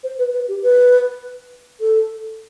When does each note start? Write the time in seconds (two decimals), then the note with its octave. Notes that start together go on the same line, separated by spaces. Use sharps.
0.04 C5
0.19 B4
0.33 B4
0.48 G4
0.63 B4
1.81 A4